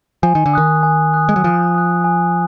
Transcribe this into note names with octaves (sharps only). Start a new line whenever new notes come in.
F3 G#5
D#3
D3
D#3 D#6 F#6
G#5
D#6 F#6
G#3
F#3
F3 G#5
D#6 F#6
G#5